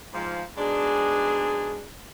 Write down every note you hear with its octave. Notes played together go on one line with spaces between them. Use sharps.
G#2 F3
G#2 B2 D4 G#4